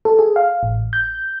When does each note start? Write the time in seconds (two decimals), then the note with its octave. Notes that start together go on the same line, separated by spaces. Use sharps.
0.05 A4
0.19 G#4
0.36 F5
0.63 A1
0.93 G6